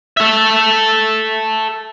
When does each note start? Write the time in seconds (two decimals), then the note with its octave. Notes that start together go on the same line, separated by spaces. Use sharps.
0.17 A4 E5